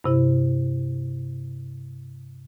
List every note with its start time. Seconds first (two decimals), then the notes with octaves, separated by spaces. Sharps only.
0.04 G2 C3 E4